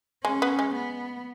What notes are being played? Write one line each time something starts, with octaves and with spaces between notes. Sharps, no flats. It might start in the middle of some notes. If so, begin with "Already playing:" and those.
G#3 C#4
B3
G#3
B3